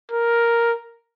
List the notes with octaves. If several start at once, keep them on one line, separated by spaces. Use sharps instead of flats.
A#4